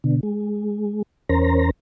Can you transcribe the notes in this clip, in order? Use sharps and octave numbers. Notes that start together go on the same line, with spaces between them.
B2 D3
G#3
E2 C#4 A#4 C5 A#5